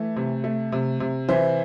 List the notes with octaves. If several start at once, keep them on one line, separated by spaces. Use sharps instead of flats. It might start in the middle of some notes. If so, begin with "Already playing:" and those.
Already playing: E3 A3
C3
A3
C3
C3
E3 C5 E5